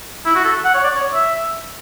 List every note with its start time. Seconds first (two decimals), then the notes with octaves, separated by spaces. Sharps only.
0.26 E4
0.35 F#4
0.44 A4
0.65 F#5
0.74 C#5
0.84 D5
0.95 C#5
1.14 E5